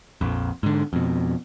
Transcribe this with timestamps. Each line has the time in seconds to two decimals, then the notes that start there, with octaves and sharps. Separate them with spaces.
0.21 A#1 F2
0.63 G#2 D3
0.93 F2 B2